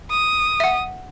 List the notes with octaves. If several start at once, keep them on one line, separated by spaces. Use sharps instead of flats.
D#6
E5 F#5